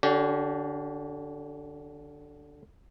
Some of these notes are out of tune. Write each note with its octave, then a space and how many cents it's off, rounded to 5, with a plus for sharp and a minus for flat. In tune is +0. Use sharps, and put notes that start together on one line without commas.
D3 +0 C#4 +35 G4 -40